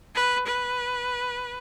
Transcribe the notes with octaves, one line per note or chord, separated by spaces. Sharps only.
B4
B4